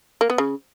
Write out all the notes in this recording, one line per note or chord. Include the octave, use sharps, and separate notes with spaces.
A#3
B3
C#3